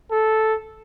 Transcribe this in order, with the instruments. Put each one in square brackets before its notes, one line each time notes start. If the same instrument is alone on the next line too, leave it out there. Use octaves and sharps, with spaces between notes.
[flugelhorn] A4